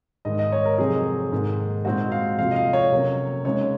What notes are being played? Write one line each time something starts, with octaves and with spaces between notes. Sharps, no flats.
G#2 D#3 G#3 D#5
D#5
C#5
A#4
F2 C3 F#3 C4 D#4 G#4
G#2 D#3 A#3
A#2 G#3 C4 D#4 F#4
F5
F2 C3 F3 F5
D#5
F5
C#5
C3 F#3 A#3 C#4
C#3 G#3 C4 D#4 C#5